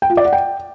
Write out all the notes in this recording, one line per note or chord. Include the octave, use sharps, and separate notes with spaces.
G5
F4
D5
F#5
G5